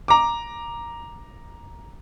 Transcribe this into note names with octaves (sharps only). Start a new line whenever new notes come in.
A#5 D6